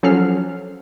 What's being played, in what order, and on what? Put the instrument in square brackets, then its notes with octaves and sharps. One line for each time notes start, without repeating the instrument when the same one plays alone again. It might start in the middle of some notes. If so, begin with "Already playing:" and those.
[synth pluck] F3 F#3 C#4 A4 F6 C7